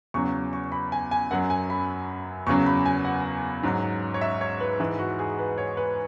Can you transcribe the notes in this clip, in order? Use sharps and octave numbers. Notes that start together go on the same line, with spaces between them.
E2 C#3 F#3 C#6
C#6
B5
G#5
G#5
F#2 F#3 F#5
G#5
B5
E2 C#3 F#3 C#6
B5
G#5
F#5
G#2 F#3
C#5
E5
C#5
B4
G#2 E3 B4
F#4
G#4
B4
C#5
B4